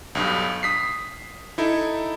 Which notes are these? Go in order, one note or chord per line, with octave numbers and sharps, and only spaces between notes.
B1 G2 D#6
D#6 B6 C7
D#4 E4 A4